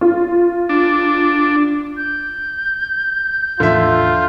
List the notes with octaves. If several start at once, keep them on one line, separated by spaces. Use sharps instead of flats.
F4
D4
G6
E2 A2 D3 F3 F4 E5